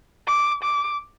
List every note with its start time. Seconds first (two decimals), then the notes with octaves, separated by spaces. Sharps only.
0.27 D6
0.63 D6